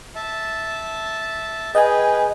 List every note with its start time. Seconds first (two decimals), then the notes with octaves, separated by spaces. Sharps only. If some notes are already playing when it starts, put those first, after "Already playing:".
0.15 E5 A5
1.75 G#4 B4 D#5 G5 G#5